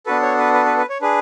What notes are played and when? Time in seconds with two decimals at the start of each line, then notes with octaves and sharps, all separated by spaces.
0.06 B3 D4 F#4 A4 B4
0.22 C#5
0.38 B4
0.54 B4
0.66 B4
0.78 B4
0.89 C#5
1.01 D4 G#4 B4